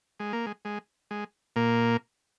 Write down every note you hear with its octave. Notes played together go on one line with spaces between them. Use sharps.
G#3
A#3
G#3
G#3
G#3
A#2 A#3